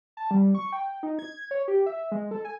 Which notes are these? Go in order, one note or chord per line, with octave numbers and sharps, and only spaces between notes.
A5
G3
C#6
G5
D#4
G#6
C#5
G4
E5
G#3
A4
G#5